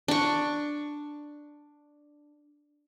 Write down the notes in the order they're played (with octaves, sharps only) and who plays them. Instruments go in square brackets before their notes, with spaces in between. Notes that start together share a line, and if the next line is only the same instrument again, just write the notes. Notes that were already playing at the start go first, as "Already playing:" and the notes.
[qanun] D4 C#6